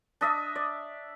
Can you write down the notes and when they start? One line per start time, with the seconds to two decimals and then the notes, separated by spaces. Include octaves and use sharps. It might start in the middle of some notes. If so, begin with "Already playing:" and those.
0.21 D4 D#5 E5
0.55 D5